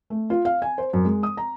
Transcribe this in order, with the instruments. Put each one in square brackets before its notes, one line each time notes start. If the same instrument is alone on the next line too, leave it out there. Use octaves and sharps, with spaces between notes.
[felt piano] A3
F4
F5
G#5
C5
F#2
G#3
D#6
A#5